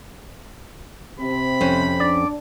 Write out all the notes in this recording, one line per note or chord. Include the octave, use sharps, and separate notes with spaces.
C3 C4 B5
F2 C#4 C5
D4 D5